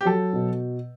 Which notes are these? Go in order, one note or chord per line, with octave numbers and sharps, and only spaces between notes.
G4
F#3 A4
B2